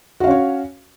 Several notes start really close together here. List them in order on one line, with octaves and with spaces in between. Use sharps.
F#4 F5 C#4 C#5